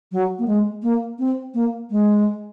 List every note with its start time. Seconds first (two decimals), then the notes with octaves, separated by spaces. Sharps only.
0.12 F#3
0.39 A#3
0.47 G#3
0.83 A#3
1.19 C4
1.54 A#3
1.91 G#3